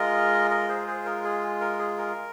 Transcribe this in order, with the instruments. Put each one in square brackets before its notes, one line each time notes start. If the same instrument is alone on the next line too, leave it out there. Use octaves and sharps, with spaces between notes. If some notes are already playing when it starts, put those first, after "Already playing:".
Already playing: [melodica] G#3 F4 A#4 D#5
A#4 D#5
G#4 C5
G#4 C5
A#4
G#4
A#4
G#4
A#4